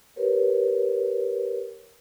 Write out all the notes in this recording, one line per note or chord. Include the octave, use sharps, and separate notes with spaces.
G4 A#4 B4 C#5